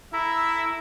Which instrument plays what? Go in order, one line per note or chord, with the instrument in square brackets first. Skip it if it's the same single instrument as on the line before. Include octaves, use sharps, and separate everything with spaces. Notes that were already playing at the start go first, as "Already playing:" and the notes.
[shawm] E4 [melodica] A4 A#5 [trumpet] E5